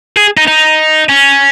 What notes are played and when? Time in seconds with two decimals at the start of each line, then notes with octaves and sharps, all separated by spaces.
0.17 G#4
0.37 D#4
0.48 D#4
1.09 C#4